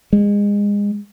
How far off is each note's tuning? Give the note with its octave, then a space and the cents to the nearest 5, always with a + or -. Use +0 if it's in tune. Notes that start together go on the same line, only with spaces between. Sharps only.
G#3 -25